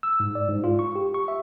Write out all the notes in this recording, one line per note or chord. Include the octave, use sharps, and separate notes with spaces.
E6
G#2
D5
G#2
F4
C#6
G4
C#6
E5